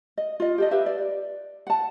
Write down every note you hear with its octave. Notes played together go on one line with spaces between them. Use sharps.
D#5
F4 D#5
G4 A4 D#5
G4 B4 E5 F5
D5
F#5 A5